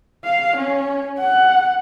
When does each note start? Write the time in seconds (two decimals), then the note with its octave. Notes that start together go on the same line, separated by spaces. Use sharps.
0.24 F5
0.57 C#4
1.19 F#5